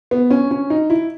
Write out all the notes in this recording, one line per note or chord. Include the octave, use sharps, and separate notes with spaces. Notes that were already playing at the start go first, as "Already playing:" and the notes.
B3
C#4
C#4
D#4
E4